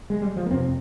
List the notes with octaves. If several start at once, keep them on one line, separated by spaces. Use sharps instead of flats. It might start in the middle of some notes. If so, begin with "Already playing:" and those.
G#3
G3
F3
A#3
F2 C3 C4